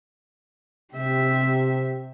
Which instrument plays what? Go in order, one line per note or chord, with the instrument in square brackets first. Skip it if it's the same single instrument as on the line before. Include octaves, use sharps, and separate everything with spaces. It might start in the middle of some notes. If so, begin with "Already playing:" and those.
[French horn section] C3 [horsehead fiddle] G4 E5